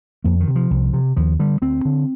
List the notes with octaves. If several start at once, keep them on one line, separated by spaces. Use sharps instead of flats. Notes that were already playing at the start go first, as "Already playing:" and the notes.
F2 A#3
D#3
C3
F3
C2
C3
D#2 F3
D3 G3
D2 C4
D3